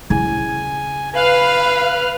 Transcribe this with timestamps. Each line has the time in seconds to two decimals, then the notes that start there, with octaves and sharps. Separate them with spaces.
0.10 C#3 E4 G#5
1.16 B4 F5 F6 F#6